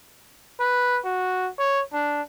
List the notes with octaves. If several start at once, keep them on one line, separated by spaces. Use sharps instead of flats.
B4
F#4
C#5
D4